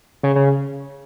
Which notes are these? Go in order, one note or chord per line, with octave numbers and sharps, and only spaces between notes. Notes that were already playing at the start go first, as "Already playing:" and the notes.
C#3
C#3